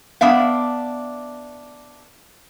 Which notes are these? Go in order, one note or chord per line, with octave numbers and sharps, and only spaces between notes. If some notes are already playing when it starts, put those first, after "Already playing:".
B3 D4 E5 F5